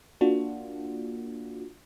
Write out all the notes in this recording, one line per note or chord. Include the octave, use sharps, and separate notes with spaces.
A#3 D4 F4 F#4